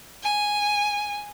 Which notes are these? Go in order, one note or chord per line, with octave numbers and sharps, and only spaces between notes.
G#5